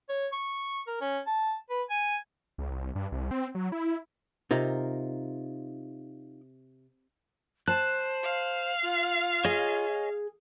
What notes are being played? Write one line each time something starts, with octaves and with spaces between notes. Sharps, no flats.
C#5
C#6
A#4
C#4
A5
B4
G#5
C#2
C2
G2
C2
C4
F#3
E4
C3 D#4 F4 A#4
C5 A5 F#6
F5
F4
G#4 C#5 D#5 G#5